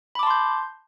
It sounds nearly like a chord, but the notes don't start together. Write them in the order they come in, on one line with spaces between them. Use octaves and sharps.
B5 D6 A5 C6 G6